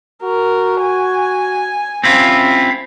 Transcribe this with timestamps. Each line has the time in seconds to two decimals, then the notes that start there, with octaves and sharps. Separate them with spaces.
0.23 F#4 A#4
0.81 G#5
2.04 C4 C#4 E4 F4